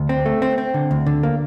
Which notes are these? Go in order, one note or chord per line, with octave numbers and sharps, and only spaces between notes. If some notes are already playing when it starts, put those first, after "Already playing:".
Already playing: D2
C4
A3
C4
C4
D3
D2
D3
A#3